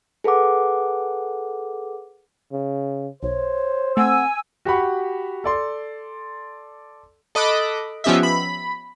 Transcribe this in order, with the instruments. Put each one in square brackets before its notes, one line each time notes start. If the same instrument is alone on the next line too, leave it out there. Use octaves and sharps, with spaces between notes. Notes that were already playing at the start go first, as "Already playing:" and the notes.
[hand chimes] G#4 A4 B4 F#5 D6
[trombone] C#3
[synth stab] B1 [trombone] C5 [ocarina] C#5
[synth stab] A3 C4 [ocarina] F#5 [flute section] G#5 E6
[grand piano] F#4 G4 F#5 B5 C#6
A4 D5 C6
[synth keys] A4 D#5 B5 D6 F#6
F3 B3 C#4 G4 D#5 E5
B5